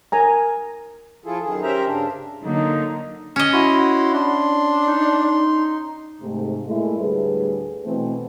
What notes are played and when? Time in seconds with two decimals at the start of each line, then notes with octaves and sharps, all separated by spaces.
0.12 A#4 G#5 A#5
1.24 F3 E4 F4 G#4 A4
1.42 F#2 D#3 G#4
1.63 C#4 G4 A#4 C5 E5 A#5
1.86 G2 C#3 D4
2.44 D3 F#3 A#3 D#4
3.36 C#4 D#5
3.53 E4 F#4 C6
4.13 D4 C6
4.88 D#4
6.21 G#2 C3 A3
6.67 A#2 G#3 A3 E4 A4
6.99 D2 A2 G3 G#4 B4
7.85 B2 E3 A3 C4 B4 C5